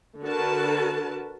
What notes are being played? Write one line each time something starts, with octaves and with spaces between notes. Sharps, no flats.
D3 F#4 A#4 B4 A5